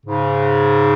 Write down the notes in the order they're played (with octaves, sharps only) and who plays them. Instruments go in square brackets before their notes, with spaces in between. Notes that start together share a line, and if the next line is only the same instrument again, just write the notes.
[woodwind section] G#2 C#3